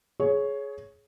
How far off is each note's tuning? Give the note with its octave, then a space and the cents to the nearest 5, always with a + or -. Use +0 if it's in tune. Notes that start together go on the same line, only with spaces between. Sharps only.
G#4 +20 C#5 +0